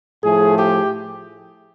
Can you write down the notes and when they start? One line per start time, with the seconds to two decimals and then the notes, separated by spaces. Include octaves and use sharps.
0.22 A2 F3 A3 G#4
0.58 G4